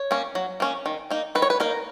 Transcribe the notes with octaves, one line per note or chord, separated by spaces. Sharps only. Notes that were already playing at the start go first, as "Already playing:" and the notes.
Already playing: C#5
A#3 C#4
F#3
A#3 C#4
D#3
A#3 D#4
D#3 B4
C#5
B4
A#3 D#4 A#4